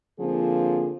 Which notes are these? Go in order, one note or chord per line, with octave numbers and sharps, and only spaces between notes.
D3 F3 A#3 C4 F4 G#4